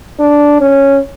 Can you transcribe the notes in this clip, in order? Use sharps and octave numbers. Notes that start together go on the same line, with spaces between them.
D4
C#4